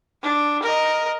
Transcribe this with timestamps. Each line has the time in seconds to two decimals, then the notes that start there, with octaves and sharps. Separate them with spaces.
0.23 D4
0.63 A#4 D#5